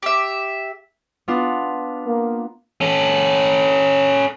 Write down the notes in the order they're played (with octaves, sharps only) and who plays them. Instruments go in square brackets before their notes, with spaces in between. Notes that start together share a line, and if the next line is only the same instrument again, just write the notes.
[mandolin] G4 E5
[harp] B3 D4 F4
[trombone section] A#3
[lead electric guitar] C#4 A4